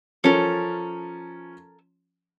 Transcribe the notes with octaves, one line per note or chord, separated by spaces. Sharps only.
F3 C#4 A4 A#4